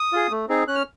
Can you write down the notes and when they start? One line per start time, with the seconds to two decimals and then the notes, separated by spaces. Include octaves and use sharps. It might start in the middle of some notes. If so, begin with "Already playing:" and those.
Already playing: D#6
0.12 F4 G#4
0.31 A3
0.49 C4 D#4 G#4
0.68 C#4 F#6
0.75 F6